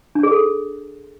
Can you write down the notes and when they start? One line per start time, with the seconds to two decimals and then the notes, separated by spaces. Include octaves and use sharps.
0.15 D4
0.23 G#4
0.31 A4